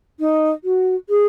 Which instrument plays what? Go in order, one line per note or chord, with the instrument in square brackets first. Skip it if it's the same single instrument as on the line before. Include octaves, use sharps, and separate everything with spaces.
[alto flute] D#4
F#4
G#4